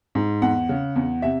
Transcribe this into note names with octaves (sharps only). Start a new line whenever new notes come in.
G#2
E2 F#5
C#3
E2
C3 E5